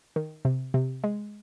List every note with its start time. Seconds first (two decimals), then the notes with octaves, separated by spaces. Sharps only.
0.16 D#3
0.45 C3
0.74 C3
1.04 G#3